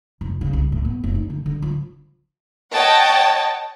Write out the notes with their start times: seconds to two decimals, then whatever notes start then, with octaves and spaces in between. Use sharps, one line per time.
0.21 F1
0.41 C#3
0.53 C2
0.72 A2
0.85 B3
1.04 F1
1.15 D#4
1.30 D3
1.46 D3
1.62 F3
2.72 C#5 D#5 F#5 G5 A5